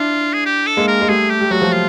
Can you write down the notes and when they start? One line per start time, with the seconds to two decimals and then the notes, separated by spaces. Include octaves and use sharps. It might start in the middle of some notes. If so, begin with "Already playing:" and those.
Already playing: D4 E4 F4
0.34 G#4
0.45 G4
0.67 A4
0.77 G#3 A#3
0.87 A#4
1.02 G#3
1.09 G3 A3 G#4
1.30 G4
1.41 G3
1.51 F#3 F#4
1.61 F3 G3
1.73 F4